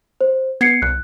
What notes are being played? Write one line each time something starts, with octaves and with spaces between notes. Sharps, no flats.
C5
B3 G#6 C7 C#7
C2 F#6